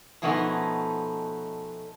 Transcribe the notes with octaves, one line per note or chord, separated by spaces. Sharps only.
B2 F3 A3 B3 C#4 D#4